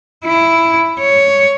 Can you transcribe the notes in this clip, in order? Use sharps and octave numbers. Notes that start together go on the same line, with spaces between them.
E4
C#5